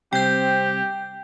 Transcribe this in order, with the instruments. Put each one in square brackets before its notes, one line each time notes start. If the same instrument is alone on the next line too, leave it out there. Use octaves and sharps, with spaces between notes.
[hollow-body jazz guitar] C3 G3 [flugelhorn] C4 [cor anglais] G4 [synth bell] G5 G6